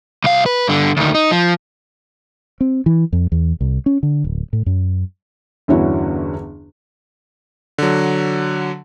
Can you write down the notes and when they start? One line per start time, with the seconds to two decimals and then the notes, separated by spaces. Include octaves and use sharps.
0.24 C2 F5
0.46 B4
0.68 G2 D3
0.97 D2 D#3
1.15 D#4
1.31 F3
2.61 C4
2.86 E3
3.13 F2
3.32 E2
3.61 C2
3.86 C#4
4.03 D3
4.24 D1
4.53 A2
4.66 F#2
5.68 G1 E2 D3 C#4 E4 F#4
7.78 D3 F#3